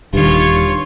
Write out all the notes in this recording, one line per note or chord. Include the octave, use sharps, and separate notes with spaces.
D#1 G2 D#3 F4 C#5